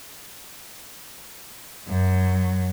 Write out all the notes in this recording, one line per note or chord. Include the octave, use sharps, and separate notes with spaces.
F#2 F#3